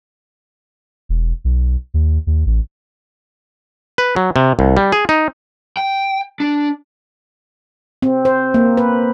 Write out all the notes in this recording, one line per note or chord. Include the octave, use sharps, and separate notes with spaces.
E1
B1
D#2
D#2
A1
B4
F#3
C3
C2
G3
G#4
D#4
G5
D4
C4
C5
A#3
B4